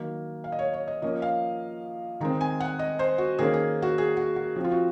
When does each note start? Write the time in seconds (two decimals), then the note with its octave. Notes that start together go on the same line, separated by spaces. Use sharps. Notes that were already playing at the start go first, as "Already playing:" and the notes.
Already playing: D#3 F#3 A#3
0.44 F5
0.52 D#5
0.59 C#5
0.73 C#5
0.88 D#5
1.02 F3 A#3 C#4 D#5
1.22 F5
2.20 D#3 G#3 C4 A#5
2.41 G#5
2.60 F#5
2.79 D#5
2.99 C5
3.18 F#4
3.39 D#3 A#3 C#4 G#4
3.54 G#4
3.82 F#4
3.98 G#4
4.17 F#4
4.36 F#4
4.56 F3 C4
4.64 F4
4.72 F#4